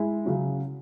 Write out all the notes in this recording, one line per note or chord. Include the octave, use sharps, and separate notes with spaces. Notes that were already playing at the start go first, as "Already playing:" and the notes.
Already playing: G#3 E4
C#3 F#3 C#4